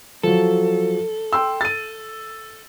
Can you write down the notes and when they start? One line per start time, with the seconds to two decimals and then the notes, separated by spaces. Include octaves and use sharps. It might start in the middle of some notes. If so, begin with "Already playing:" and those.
0.23 F3 F#3 A4
1.33 G5 C6 E6
1.61 A6 D#7